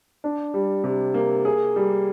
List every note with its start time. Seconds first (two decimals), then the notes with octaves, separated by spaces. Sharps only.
0.24 D4
0.54 G3
0.84 C3
1.14 A#3
1.45 G#4
1.76 G3